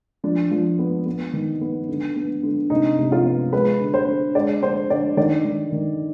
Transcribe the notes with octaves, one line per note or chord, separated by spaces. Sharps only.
F3 D4
F3
B3
B3
D#3
B3
D3
B3
D3
C3 D#4
C3
F4
B3
G#3 B4
D3
C5
D3
G#3 D5
D3 C5
D3 D5
D#3 D5
D#3
D#3